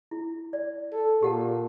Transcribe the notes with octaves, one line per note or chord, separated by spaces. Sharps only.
E4
D5
A4
A#2 G4 F#5 A5